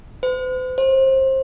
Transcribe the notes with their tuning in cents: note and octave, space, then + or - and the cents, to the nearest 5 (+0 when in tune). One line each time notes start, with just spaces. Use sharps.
C5 -45
C5 +25